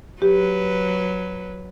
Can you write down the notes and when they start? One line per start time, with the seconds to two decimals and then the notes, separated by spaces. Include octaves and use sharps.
0.22 F#3 G4 B4